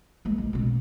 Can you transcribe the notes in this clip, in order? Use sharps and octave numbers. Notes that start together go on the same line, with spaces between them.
G#3 A#3
A#1
B2 C#4